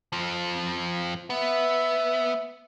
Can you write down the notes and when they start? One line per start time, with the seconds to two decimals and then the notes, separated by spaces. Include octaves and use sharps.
0.13 F2 F3
1.30 B3 E5